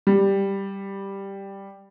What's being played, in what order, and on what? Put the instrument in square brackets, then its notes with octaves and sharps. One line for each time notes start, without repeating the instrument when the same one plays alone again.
[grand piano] G3